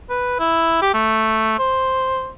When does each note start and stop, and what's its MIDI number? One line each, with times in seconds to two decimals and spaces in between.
0.10 0.36 71
0.39 0.78 64
0.82 0.90 67
0.94 1.56 57
1.59 2.31 72